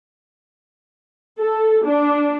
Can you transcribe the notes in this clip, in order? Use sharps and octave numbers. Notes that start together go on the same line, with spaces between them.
A4
D4